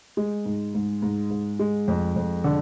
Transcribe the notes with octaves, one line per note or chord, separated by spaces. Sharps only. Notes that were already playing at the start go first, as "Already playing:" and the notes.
G#3
G#2
G#2
G#2
G#2
G#3
F2
F2
D3